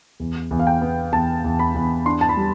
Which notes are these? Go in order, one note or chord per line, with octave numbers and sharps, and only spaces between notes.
E2
E2
F5
G5
B3
E2 A5
E2
B5
E2
D4 C6
A5
B5
G3